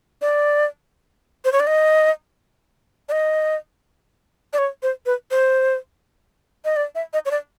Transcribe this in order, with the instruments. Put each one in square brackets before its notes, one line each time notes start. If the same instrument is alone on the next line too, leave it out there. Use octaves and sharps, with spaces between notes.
[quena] D5
C5
C#5
D5
D#5
D5
D#5
D5
C#5
C5
B4
C5
D#5
D5
E5
D#5
C#5
D5